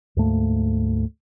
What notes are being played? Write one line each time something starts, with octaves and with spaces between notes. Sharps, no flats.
D2 G#2 A3 A#3